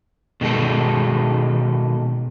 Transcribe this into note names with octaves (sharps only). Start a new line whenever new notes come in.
B2 D#3 G#3 A4